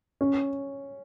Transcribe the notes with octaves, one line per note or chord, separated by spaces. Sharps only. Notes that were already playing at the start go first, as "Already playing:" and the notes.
C#4